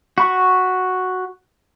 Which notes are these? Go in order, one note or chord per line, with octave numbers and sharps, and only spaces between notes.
F#4 B5 C#6